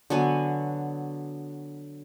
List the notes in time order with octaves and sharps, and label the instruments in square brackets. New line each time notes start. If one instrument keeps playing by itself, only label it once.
[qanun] D3 F#3 B3 G#5